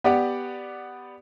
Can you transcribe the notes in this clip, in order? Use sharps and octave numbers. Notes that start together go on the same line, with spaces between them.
B3 G4 D5 F#5